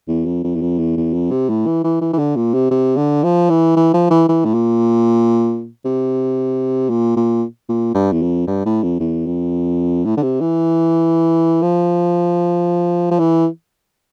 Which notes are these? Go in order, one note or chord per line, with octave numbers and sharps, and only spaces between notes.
E2
F2
F2
E2
F2
E2
E2
F2
C3
A2
E3
E3
E3
E3
D3
A#2
C3
C3
D3
F3
E3
E3
F3
E3
E3
A2
A#2
C3
A#2
A#2
A#2
G2
E2
F2
G2
A2
F2
E2
F2
A2
D3
C3
E3
F3
F3
E3